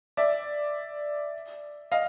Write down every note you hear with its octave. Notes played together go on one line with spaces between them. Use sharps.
D5 E5
D#5 F5